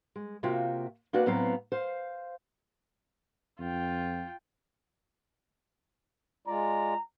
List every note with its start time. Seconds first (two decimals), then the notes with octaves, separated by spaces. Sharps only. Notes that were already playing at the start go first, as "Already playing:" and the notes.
0.16 G#3
0.43 C3 A#3 F4 F#4 E5 G5
1.13 A#3 C4 D4 F#4 B4 D5
1.26 A2 F#3 B3 C4 F5 A#5
1.72 C5 F5
3.59 F2 F4 G5
6.47 G#3 F4 D5 A#5